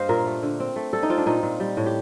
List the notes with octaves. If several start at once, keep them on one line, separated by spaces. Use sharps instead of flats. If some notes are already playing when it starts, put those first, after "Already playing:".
Already playing: G2 A#3 C5 D#5 F5
A#2 A#4
A3
D3
C4
A3
G3 A4
D#4
C4 F4
D4
A#2 D#4
A#2
G3
A2
G4